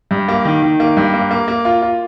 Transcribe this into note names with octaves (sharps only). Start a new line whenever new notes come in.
G2
A#3
D#3
D#3
A#3
G2
A#3
A#3
A#3
F4
F4